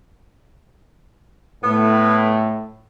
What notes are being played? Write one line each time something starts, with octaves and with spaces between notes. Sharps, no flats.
A2 B3